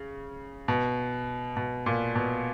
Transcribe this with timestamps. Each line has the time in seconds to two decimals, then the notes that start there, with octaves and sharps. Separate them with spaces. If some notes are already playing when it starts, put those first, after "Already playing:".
Already playing: C#3
0.68 B2
1.57 B2
1.86 A#2
2.16 B2